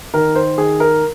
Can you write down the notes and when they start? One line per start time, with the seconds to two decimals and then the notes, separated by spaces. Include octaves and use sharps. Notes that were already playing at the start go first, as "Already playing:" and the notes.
0.14 D#3 A#4
0.35 C5
0.58 D#3 G#4
0.80 A#4